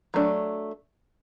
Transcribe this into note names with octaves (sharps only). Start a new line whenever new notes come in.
F#3 A3 D4